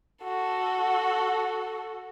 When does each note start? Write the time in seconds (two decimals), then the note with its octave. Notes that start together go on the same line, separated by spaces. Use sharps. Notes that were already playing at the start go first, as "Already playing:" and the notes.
0.24 F#4 A4